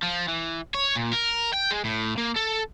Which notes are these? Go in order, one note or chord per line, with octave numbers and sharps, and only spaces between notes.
F3
E3
C#5
A#2
A#4
G5
G#3
A2
A#3
A4